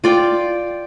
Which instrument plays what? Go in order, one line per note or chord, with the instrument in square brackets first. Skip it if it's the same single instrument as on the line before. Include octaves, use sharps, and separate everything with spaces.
[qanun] F4 D5 G5